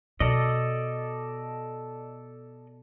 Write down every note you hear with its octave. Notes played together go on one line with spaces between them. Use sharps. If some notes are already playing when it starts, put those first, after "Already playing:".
B2 A4 D5 D#5